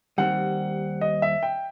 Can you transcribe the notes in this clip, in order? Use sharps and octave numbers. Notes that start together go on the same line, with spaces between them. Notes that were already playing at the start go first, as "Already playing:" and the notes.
D#2 D#3 G3 C4 F#5
D#5
E5
G5